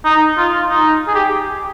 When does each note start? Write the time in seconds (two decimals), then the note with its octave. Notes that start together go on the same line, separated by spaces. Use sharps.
0.05 D#4
0.38 F4
0.69 D#4
1.08 G#4
1.15 G4